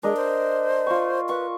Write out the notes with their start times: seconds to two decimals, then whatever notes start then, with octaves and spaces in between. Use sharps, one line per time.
0.03 G#3 D4 A#4 D#5
0.16 C5
0.87 F4 C#6
1.29 B4 C#6